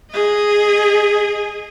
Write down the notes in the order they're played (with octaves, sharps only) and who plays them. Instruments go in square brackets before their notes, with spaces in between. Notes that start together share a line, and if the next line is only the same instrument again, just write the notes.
[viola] G#4 D#5